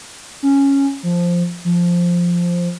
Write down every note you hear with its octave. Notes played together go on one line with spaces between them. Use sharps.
C#4
F3
F3